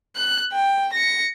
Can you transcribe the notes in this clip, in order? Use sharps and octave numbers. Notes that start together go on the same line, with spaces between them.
F#6
G5
A#6 C#7